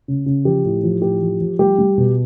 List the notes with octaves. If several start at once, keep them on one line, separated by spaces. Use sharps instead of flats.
C#3
C#3
F3 G4
A2
F3
A2 G4
F3
F3
G3 G4
G3
B2